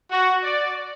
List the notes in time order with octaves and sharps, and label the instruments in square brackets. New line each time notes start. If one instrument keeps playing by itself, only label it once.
[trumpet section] F#4
D5